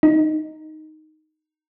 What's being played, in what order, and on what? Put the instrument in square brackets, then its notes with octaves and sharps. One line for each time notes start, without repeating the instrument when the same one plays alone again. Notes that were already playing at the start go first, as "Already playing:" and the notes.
[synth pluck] D#4